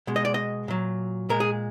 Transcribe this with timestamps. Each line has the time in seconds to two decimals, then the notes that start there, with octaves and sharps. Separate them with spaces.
0.07 B2 G#3
0.16 D#5
0.25 D5
0.34 D#5
0.68 A#2 F#3
1.29 A#2 G#3 A#4
1.40 G#4